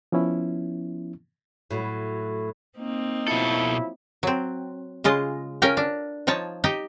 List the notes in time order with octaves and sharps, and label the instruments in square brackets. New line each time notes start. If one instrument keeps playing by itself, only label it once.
[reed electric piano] F3 B3 C#4 E4
[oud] A2 F#3
[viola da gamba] A#3 C4 D#4
[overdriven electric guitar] B2 A4 [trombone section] F3 F#3 E4
[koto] F#3 C4
C#3 G#3 F4 D#5
C#4 A#4 F5 G5 A#5
D4
F3 D#4 C#5 A5
D#4 G4 D#5